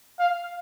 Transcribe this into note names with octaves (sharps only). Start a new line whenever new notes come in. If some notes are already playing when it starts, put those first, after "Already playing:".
F5